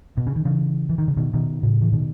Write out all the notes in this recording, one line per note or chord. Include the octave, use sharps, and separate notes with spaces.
B2
C#3
D#3
C#3 E3
E3
D#3
C#3
B2 D#3
B2 D#3
A2 C#3
E3
B2 D#3